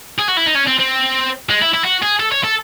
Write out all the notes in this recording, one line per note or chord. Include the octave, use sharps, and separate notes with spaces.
G#4
F#4
E4
D#4
C#4
C4
C4
G#3
E4
E4
F#4
G#4
A4
C#5
A4